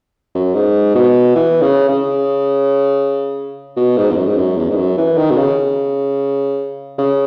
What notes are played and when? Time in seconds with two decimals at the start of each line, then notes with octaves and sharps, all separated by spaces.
0.35 F#2
0.54 G#2
0.95 B2
1.35 E3
1.61 C#3
1.89 C#3
3.77 B2
3.97 G#2
4.10 E2
4.17 F#2
4.27 G#2
4.37 F#2
4.57 E2
4.70 G#2
4.77 F#2
4.98 E3
5.18 D#3
5.30 B2
5.37 C#3
6.99 C#3